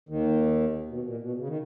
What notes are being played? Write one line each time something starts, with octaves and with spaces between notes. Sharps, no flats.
D#2 D#3
B2
A#2
B2
C#3
D#3